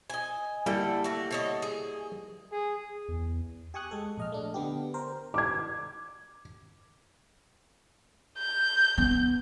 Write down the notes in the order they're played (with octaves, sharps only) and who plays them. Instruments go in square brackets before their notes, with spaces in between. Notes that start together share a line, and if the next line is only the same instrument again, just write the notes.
[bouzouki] D#5 G#5
[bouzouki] D3 A4 [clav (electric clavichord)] G3 A#3 E4
[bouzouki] A3 F#4
D3 C#5 D#5
G#4
[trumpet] G#4
[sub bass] E2
[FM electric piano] G4 G#5 C#6 D#6 F#6
G#3 A4
A#1 D#5 F6
A3 D4
D3 B3 G4
A#4 C5
[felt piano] D6 G#6
[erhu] G6
[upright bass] B3